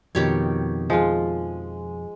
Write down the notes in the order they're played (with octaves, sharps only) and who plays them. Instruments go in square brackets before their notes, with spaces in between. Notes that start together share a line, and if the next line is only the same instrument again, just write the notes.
[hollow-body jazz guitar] F2 B2 [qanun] D#3 G4 C#5
[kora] F3 F4 [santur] G#3